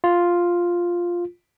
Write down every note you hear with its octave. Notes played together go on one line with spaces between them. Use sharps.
F4